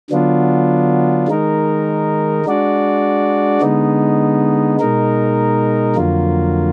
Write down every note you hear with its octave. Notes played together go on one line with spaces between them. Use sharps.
D3 F#3 B3 D4 F4
D#3 G#3 D#4 A#4
G#3 D4 F#4 D5
D3 G#3 B3 D#4
B2 G#3 D#4 A#4
F2 D3 F#3 A#3 F4